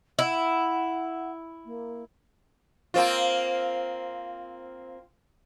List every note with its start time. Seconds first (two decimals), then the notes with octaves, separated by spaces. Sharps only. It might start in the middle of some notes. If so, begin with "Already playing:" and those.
0.19 E4 F#5
1.65 A#3
2.94 A#3 C4 F4